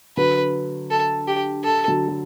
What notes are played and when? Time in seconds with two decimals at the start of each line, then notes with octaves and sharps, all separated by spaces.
0.17 D3 F#3 B4
0.90 A4
1.27 G4
1.64 A4
1.88 D3 F#3
2.08 F#3